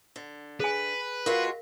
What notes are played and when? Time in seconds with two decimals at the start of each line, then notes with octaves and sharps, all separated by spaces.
0.16 D3
0.60 G#4 B4 G#5
1.26 G#3 F4 F#4 A#4 F5